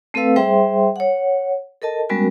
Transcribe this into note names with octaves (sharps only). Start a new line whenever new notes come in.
A3 C4 A4 B4 F5 E6
G3 G#4 C5 E5 G5 C6
C#5 F#5
A4 A#4 D#5 A5
G3 G#3 B3 C#4 F#4 A#4